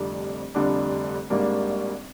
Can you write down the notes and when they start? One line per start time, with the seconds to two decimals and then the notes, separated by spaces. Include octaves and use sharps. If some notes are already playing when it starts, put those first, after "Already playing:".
Already playing: F1 F2 D3 G3 D4
0.55 F1 F2 D3 G3 D4
1.30 G#1 G#2 G3 A#3 D4